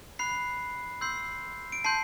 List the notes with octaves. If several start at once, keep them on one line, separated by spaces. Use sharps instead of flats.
B5 F#6 C7
C6 E6 G6 C7
D7
A5 C6 G6 C7